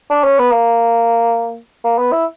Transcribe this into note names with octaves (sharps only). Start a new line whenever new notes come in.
D4
C#4
B3
A#3
A#3
B3
E4